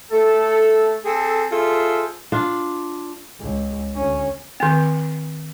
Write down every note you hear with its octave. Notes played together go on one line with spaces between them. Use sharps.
A3 A4
C4 G#4 A4
F4 G#4 A4 C5 E5
D4 F4
C#2
D2 C#4
D#3 C4